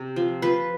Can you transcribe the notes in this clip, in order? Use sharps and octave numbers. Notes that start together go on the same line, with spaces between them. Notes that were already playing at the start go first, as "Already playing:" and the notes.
Already playing: C3
F3
F3 B4